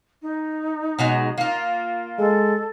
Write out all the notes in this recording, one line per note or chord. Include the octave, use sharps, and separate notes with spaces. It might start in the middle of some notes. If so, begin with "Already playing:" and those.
D#4
B2 F#3 G#3
A#3 F4
G#3 A4